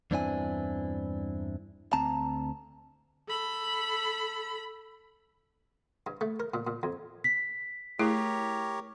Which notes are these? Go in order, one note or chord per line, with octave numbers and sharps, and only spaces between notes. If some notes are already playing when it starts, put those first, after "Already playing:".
E2 G2 C4 D4 E4 G#5
D2 C4 A5 A#5
A4 B5
G2
A3
A#4
A#2
A#2
F2
B6
A3 E4 G4 G#4 A#4 C#5